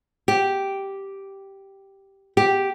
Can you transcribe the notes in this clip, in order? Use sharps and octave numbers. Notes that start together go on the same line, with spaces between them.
G4
G4